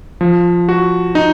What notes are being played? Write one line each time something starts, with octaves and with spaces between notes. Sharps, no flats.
F3
F#4
D#4